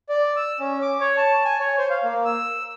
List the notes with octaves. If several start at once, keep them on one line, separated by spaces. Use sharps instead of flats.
D5
E6
C#4
D6
C#5
A5
G#5
C#5
C5
F5
A#3
E6